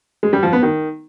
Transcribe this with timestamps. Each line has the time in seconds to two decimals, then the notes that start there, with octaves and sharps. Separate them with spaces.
0.23 G#3
0.33 G3
0.43 F3
0.53 B3
0.63 D#3